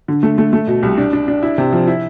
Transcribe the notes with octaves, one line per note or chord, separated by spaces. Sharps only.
D3
A3
A3
A3
B2
C2
D4
D4
D4
E4
C3
F3
E4